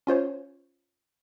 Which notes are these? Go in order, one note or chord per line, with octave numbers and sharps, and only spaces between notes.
C#4 F4 C5 C#5